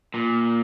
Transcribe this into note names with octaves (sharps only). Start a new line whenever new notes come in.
A#2